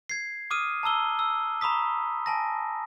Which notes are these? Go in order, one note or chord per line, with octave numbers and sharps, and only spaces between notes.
G#6 C7
D6 D#6 F6 D#7
A5 A#5 E6 G7
E6
A#5 B5 C#6 D#6 B6
G#5 A5 A#6